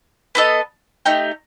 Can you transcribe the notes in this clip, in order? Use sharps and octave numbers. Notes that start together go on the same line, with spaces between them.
B3 E4 A4 D#5
A3 D#4 G4